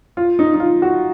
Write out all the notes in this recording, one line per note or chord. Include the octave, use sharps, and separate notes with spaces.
F4
D#4
D#4
F4
F#4